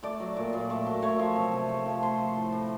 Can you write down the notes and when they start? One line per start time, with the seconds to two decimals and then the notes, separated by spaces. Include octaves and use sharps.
0.03 A3 D5
0.20 F#3
0.37 A#2
0.53 A#2
0.70 A3
0.87 F#3
1.02 A3 C#5
1.19 F3
1.36 C3
1.52 C3
1.69 A3
1.86 F3
2.03 A3 C5
2.19 F3
2.36 A2
2.52 A2